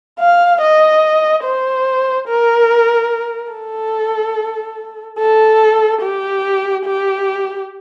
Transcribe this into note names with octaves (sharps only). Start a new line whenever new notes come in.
F5
D#5
C5
A#4
A4
A4
G4
G4